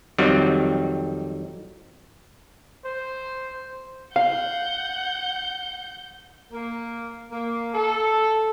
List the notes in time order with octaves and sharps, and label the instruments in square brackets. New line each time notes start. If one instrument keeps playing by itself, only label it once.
[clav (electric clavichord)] F2 D#3 F#3 G3 C4
[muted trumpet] C5
[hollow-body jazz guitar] F5 [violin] F#5 G6
[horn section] A#3
A#3
A4